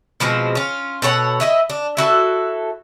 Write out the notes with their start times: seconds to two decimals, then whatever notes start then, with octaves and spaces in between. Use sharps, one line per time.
0.20 B2 F3 G#3 C4
0.55 C#4 F4
1.02 B2 A4 C#5 F#5
1.40 E4 D#5 E5
1.70 D4
1.97 E4 F#4 A4